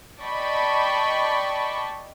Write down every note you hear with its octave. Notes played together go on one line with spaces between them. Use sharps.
D5 D#5 G5 A5 B5 C#6